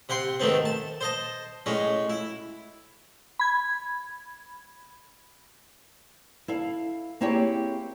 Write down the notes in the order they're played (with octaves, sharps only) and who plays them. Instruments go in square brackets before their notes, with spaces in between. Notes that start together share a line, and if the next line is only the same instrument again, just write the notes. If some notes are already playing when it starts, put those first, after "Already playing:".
[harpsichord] C3 F#5 G5 C6
G#2 D#3 A3 B3 C4
A5
C5 D#5 A5
A2 G#3 C#4
E4
[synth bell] B5 G#6
[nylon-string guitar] E4 A4 F5
A#3 C4 E4 G4 G#4 C#5